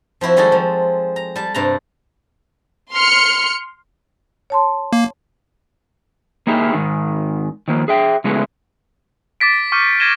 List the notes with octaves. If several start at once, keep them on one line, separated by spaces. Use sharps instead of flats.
F3 C4 E4 F#4
D#3 G3 G#3 F#4 A4
F3
A#5
G3 A5
G2 C3 A5 A#5
C6 F6 C#7
C#5 A5 C6
A#3
A#3 D#4 E4 G4 G#4
G#2 D#3
D#3 F3 A#3
G#4 E5 G5
C#3 G#3 A3 B3 E4
D6 A6 B6 D7
C#6 D6 F6 G6 C#7 D#7
G#6 A#6 C7 D#7 E7 G7